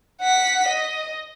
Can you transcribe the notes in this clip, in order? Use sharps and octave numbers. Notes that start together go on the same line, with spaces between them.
F#5 B6
D#5